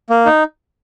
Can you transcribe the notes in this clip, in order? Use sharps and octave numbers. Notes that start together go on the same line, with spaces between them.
A#3
D#4